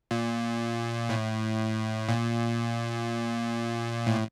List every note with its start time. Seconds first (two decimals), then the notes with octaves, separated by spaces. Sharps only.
0.11 A#2
1.09 A2
2.09 A#2
4.07 A2